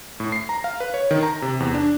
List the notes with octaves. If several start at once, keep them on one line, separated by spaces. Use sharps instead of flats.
A2
C7
A#5
F5
B4
C#5
D#3
A#5
C3
E2
D4